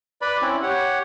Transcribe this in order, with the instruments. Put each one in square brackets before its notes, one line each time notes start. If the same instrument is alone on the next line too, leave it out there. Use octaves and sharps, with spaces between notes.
[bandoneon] B4 D5 B5
C4 C#4 E4
G4 C#5 F#5